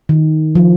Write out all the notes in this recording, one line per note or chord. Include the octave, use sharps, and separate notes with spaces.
D#3
F3